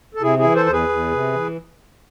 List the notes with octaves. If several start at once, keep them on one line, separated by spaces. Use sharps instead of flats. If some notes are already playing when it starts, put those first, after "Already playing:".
A4
C3 E4 G#4
E4 G#4
E3
A4 C5
E2 C5
G#4 B4
E2
C3
E3